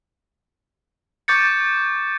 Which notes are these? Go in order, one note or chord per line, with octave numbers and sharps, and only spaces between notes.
C#6 D6 G6 A6 C#7